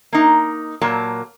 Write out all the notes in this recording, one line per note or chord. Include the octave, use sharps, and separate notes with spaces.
A#3 D#4
A#2 F#3 A#3 A5